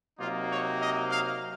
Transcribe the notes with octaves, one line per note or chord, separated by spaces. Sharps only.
C3 F#3 A#3 D#4 F4
C#5
D#5
F5